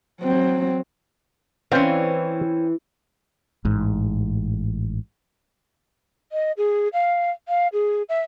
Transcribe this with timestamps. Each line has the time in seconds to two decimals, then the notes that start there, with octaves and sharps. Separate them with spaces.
0.21 F#3 C4
1.72 E3 C4 C#4 C5 D5 F5
3.65 A1 G#2
6.32 D#5
6.57 G#4
6.93 F5
7.48 F5
7.73 G#4
8.09 E5